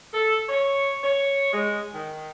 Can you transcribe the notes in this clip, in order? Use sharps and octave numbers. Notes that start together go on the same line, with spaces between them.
A4
C#5
C#5
G#3
D#3